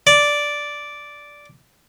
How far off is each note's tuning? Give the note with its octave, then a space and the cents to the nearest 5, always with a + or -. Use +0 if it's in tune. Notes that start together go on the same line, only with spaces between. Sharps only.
D5 -5